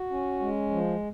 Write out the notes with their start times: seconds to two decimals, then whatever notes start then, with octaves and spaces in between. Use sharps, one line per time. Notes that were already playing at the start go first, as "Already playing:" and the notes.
Already playing: F#4
0.10 C#4
0.40 G#3
0.70 F3